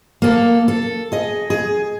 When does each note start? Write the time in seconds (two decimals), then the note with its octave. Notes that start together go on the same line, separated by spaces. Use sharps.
0.22 A#3 A4
0.68 A4
1.12 G#4 D#5
1.50 G#4